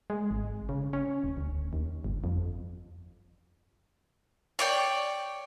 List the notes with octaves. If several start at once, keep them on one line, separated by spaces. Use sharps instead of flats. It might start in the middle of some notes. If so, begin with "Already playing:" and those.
G#3
G#1
C#3
C#4
D#1
D2
D#2
G1
F2
C#5 D5 G5